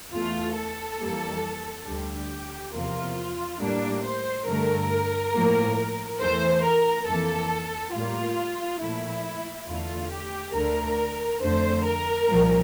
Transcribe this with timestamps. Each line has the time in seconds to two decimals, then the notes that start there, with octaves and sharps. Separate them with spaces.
0.12 E2 E3 A3 F4
0.56 A4
1.00 F2 E3 G3 A#3
1.87 D2 D3 G3 G4
2.73 E2 C3 F3 A#3 F4
3.60 A2 G3 A#3 D4
4.03 C5
4.47 G2 D3 A3 A#4
5.34 A2 F3 A#3
6.21 E2 E3 A3 C5
6.64 A#4
7.07 F2 E3 A#3 A4
7.94 A2 G3 A#3 F4
8.81 A#2 F3 A3 E4
9.67 E2 D3 A3 F4
10.11 G4
10.54 D2 D3 A3 A#4
11.41 F2 D3 A3 C5
11.84 A#4
12.28 C2 A#2 F3